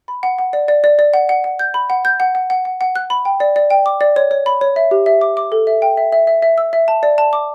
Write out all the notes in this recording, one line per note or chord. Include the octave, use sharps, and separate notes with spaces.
B5
F#5
F#5
D5
D5
D5
D5
F#5
F#5
F#5
G6
B5
F#5
G6
F#5
F#5
F#5
F#5
F#5
F#6
B5
G5
D5
D5
G5
D6
D5
C#5
C#5
B5
C#5
E5
G4
E5
D6
D6
A4
E5
G5
E5
E5
E5
E5
E6
E5
A5
D5
A5
D6